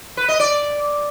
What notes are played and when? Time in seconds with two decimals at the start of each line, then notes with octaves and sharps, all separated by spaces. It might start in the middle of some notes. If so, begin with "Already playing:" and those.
0.17 B4
0.28 D#5
0.40 D5